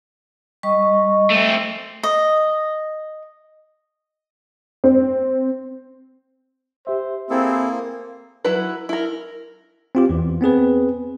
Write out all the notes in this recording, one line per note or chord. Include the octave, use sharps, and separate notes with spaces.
G3 D#5 C#6
A3 C4
D#5
C4
G4 C5 E5
A#3 C4 E4 G#4 A4
F#3 E4 B4
E4 A#4
C4 F4 G4
E2 E3
B3 C4 G#4 B4